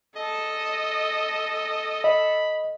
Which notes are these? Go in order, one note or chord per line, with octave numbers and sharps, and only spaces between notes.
A4 D#5
D#5 B5